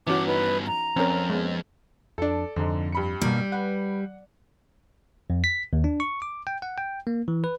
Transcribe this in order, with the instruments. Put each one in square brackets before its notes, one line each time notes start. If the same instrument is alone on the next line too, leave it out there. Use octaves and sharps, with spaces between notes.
[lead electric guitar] G2 B3 [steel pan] E3 C#4 F#4 [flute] D6
[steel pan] D#4 [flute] B4
[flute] A#5
[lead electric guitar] F2 [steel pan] C4 C#4 A#4
[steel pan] G#3 B3
[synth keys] F2 D4 [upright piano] A4 D5
[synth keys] F2 [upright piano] G#2 D3
[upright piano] G2 B5 C#7
[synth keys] B2 A#3 [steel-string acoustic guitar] G3
[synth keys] B4 [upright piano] F#5
[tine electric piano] F2
B6
D#2
D4
C#6
D6
G5
F#5
G5
A#3
E3
B4